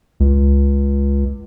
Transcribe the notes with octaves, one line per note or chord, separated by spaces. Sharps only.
C#2